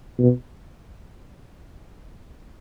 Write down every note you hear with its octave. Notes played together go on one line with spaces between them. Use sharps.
B2